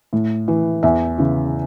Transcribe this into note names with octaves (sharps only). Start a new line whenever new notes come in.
A2
E3
E2 E5
C#3 E3